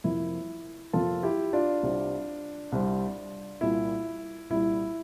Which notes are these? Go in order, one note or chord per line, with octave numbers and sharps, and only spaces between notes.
F2 C3 F3 A#3 E4
F2 C3 F3 A#3 F4 A4
E4 G4
D4 F4
C2 C3 G3 C4
C2 C3 G3 C4
C2 A#2 G3 E4
C2 A#2 G3 E4